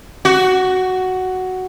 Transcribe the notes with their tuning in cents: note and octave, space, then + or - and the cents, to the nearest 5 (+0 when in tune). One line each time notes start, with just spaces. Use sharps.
F#4 +5